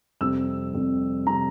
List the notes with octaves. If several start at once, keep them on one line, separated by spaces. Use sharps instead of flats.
F2 C3 G3 C4 E6
F2 C3 G3 C4
C3 G3 C4 A#5